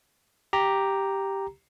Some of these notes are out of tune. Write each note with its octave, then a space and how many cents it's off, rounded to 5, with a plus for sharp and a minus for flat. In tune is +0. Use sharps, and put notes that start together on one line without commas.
G4 +0 A#5 +0